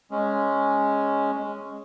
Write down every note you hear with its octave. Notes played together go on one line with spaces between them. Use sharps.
G#3 C#4